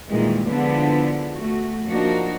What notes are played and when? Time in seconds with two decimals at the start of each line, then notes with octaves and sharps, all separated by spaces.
0.10 A#2 D#3 E3 G3 G#3
0.47 D3 F3 G#3 B3 D4 E4
1.34 A3 F#4
1.87 F3 A#3 D4 D#4 F#4